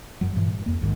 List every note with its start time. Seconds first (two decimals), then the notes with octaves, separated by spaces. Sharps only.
0.21 F#2 F#3
0.36 G2 A#2 E3 F3
0.49 G2
0.66 F2 A#3
0.81 A#1 G#2 D#3